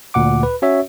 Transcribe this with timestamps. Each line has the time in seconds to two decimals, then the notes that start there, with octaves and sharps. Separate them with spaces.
0.14 D2 A#2 F#5 D6
0.43 B4
0.62 C#4 F#4 C#5 E5